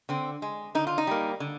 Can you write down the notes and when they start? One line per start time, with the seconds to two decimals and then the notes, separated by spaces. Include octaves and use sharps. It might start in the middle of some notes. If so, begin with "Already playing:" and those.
0.09 D3 C4
0.42 G#3
0.75 D3 D#4
0.87 F4
0.98 D#4
1.07 G3 A#3
1.40 D3